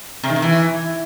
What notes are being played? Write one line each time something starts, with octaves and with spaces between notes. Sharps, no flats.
C3
D#3
C3
E3